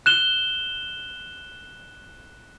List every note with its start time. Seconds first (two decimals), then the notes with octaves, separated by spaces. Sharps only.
0.06 F#6 E7 G7